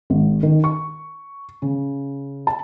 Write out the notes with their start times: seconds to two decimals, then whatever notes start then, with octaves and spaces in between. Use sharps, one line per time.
0.10 G#1
0.43 D#3
0.64 C#6
1.62 C#3
2.47 A5